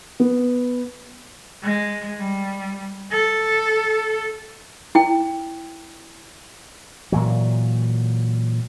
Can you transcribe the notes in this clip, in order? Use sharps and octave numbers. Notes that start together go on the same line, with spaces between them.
B3
G#3
G3
A4
E4 G5
A#2 E3 F#3